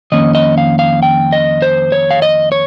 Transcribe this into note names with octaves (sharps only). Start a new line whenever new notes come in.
F2 D#3 A#3 C#4 D#5
D#5
F5
F5
G5
D#5
C5
C#5
F5
D#5
C#5